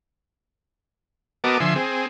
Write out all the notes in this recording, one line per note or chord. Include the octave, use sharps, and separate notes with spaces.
B3 F#4 A#4 D#5 A5 D6
D3 F3 E5 G#5 C6
C4 G#4